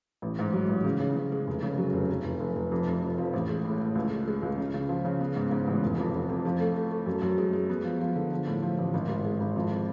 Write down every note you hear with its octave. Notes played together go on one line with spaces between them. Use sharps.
A1
G#2
F#3
A1
C#3
C#3
C#3
G#3
F1
C#3
F#3
F1
F1
F1
F1
F1
F2
F1
F2
F3
A1
G#3
A2
A2
C#2
G#3
G#3
C#2
C#3
C#3
F3
C#3
B3
G#2
G#2
A1
F1
F2
F2
F2
F3
A3
A3
A3
F#2
F#2
G#3
G#3
B3
F3
F3
D3
F3
A2
F3
A1
G#1
G#1
G#3
G#1
F2